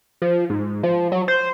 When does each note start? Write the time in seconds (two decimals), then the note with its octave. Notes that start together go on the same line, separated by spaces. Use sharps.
0.22 F3
0.50 G#2
0.83 F3
1.12 F#3
1.28 C5